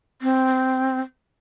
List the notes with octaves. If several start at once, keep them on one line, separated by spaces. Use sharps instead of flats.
C4